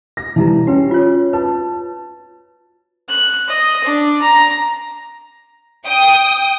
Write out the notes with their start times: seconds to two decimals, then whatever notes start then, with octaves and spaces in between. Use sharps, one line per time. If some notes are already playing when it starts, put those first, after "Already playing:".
0.17 A#6
0.36 E3 G3 D#4 A5 A#5
0.67 C#4 F#4 B4 G5
0.91 F4 C#5
1.33 B4 A5
3.08 F#6
3.48 D#5
3.84 D4
4.22 A#5
5.84 G5 D#6